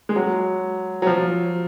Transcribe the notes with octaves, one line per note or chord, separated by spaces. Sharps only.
G#3
F#3
F#3
F3